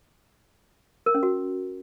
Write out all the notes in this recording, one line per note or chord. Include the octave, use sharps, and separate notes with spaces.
A#4
C#4
F#4